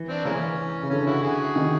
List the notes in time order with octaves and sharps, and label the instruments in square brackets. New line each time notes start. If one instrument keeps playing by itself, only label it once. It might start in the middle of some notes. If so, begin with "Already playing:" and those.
Already playing: [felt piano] E3
[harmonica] C4 D4
[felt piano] E3 [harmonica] G#3 A#3 C#4
[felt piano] C#3
[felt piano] D3 [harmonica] C#4
[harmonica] E4 F#4
F#4 G#4
[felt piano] D#3